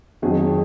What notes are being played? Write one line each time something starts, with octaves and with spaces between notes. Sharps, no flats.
F2 D#3 F#3 G#4